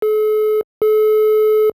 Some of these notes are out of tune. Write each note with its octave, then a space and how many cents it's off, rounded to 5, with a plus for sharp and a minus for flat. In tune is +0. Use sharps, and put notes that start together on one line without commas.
A4 -45
A4 -40